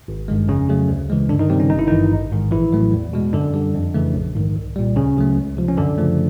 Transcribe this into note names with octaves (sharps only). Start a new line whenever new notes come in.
G#1
G2 D#3 G#3
F2 C#3 C#4
C#3 F#3 A3
D2
C#3 E3 G#3
G2 D3 D4
D#3 D#4
C3 D#3 G3 C4
C#3 C#4
G#1 D#4
E4
G2 D#3 E3 D#4
A1
G#2 D#3
A#1 E3 E4
A2 F#3 A3
E2
B2 G#3
F#2 D3 D4
D3 G3
F2
C#3 E3 A3
A#1
G#2 D#3
C2
A#2 G3
D2 C#3 C#4
C#3 F#3 A3
C#2
C3 F3
C#4
F#2 D3 D4
C#3 F3 A3